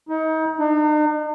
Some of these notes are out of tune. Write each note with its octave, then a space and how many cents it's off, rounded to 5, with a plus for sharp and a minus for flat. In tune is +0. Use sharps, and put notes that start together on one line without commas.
D#4 +35
D#4 -45